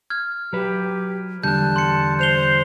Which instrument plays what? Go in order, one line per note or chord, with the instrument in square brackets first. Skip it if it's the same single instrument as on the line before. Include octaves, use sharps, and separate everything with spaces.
[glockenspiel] F6 G#6
[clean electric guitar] F#3 B4 [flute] G4
[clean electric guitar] E2 D3 G3 [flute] A5 [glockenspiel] F#6 G6
[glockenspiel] C6 C#7
[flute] C5 [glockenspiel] G6 F7 G7